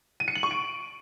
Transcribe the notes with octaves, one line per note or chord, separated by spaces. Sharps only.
D#7
C#7
F#7
C#6
D7